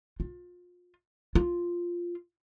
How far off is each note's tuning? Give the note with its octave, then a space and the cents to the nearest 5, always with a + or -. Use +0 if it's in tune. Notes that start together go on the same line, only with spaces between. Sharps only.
F4 +30
F4 -5